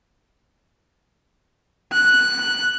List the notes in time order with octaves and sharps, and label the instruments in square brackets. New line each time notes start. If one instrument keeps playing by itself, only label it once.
[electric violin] F#6